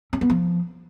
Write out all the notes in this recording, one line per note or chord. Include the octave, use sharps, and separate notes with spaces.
C#4
B3
F3